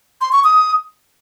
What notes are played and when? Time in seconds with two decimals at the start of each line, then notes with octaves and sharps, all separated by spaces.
0.21 C6
0.33 C#6
0.44 D#6